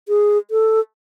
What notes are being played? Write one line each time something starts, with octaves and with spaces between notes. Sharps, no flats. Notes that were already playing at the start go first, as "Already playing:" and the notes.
G#4
A4